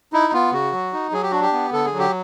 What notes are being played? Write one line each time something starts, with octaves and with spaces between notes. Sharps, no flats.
D#4 E4
B3 F4
C#3 F#4
F#3
D#4
F#3 G#4
G4
D4 F#4
G4
B3
D3 A4
G#4
F#3
G4